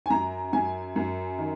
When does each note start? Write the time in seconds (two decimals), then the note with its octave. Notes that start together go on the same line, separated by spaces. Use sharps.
0.06 G#5
0.10 F#2 A#5
0.53 F#2 G#5
0.96 F#2
1.39 D#3